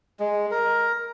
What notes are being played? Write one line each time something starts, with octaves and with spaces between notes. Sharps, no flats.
G#3
A#4